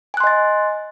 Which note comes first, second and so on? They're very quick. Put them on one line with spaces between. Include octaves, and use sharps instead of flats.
G#5 F#6 C6 D#5 A6